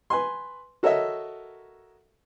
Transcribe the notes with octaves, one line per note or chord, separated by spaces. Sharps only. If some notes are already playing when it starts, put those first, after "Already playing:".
B4 G#5 C6
F#4 A4 A#4 C#5 D#5 E5